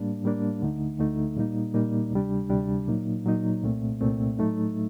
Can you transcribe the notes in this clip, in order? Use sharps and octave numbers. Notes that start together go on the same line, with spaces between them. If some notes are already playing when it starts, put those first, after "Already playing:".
Already playing: A2 G3 A#3 D4
A2 G3 A#3 D4
D2 D3 A3 D#4
D2 D3 A3 D#4
A#2 G3 A#3 D#4
A#2 G3 A#3 D#4
D2 C3 G3 D4
D2 C3 G3 D4
A#2 F#3 A#3 D#4
A#2 F#3 A#3 D#4
C2 A#2 A3 C4
C2 A#2 A3 C4
A2 F#3 A3 D#4